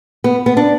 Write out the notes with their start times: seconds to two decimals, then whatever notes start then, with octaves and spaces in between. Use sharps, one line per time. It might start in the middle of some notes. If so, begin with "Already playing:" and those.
0.24 B3
0.46 B3
0.57 D4